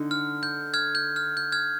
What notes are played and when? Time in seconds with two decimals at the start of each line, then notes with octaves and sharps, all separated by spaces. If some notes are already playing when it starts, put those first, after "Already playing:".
Already playing: D3 D#4
0.11 F6
0.43 G6
0.74 F6 G#6
0.95 G6
1.16 F6
1.37 G6
1.52 F6 G#6